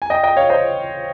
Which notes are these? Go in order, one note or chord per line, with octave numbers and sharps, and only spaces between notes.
G#5
D#5 G5
D#5 G5
C#5 F5
C5 D#5